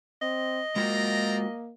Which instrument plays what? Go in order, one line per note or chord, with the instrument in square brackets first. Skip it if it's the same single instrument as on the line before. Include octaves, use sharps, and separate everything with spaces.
[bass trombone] C4 [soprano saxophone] D#5
[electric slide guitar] G#3 F4 F#4 [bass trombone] A#3 [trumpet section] C4 D5 A#5